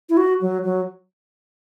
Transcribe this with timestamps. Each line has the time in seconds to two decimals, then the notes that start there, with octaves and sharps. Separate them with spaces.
0.09 E4
0.17 F#4
0.41 F#3
0.64 F#3